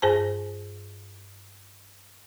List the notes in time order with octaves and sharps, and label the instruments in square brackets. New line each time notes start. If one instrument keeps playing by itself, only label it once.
[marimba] G2 G#4 C5 A5